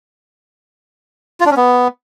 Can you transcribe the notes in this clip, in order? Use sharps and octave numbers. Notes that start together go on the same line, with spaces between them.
F4
D4
C#4
B3